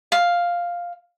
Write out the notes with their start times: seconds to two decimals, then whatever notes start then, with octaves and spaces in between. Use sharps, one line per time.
0.12 F5